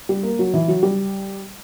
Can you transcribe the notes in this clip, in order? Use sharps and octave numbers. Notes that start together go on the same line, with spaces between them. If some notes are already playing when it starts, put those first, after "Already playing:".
G3
A#3
F#3
E3
F#3
G3